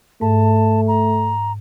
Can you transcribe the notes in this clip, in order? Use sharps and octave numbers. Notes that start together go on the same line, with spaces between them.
G#2 A3 A5
A#5